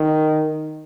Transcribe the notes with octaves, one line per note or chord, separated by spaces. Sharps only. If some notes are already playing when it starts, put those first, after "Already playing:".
Already playing: D#3